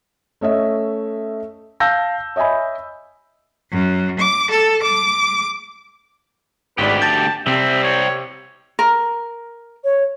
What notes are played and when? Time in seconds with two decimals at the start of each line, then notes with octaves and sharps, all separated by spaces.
0.41 A3 C#4 D#5 E5
1.80 F5 A5 E6 G6 A#6
2.36 C#5 D#5 E5 G#5 B5
3.70 F#2
4.19 D6
4.50 A4
4.83 D6
6.78 G#1 D2 G#2 G4 B4 D5
7.02 A5 G6 A6 A#6
7.47 C3 G3 C4 E5
7.84 C#5
8.79 A#4
9.84 C#5